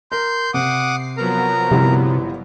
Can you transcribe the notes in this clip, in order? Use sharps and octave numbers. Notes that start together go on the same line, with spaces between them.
A#4 C6 G6
C3 F#5 D6 D#6 C7
F3 F#3 B3 A#4 A#5
G1 C3 G3 E4